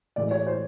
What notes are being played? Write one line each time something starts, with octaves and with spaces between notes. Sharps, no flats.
A2 E3 G#3 D5
C#5
C5